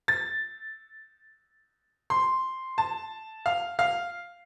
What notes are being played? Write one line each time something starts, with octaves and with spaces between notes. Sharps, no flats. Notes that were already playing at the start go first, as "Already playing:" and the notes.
A6
C6
A5
F5
F5